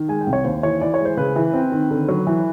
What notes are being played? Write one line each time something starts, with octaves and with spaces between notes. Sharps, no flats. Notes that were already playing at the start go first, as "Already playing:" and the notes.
Already playing: D#3
G#3 G#5
G5
C2
C#5
D#2 C5
E3 C#5
E3 D5
C#5
G#3
C5
C#3 B4
E3
C4
D#3
D3
F#3
E3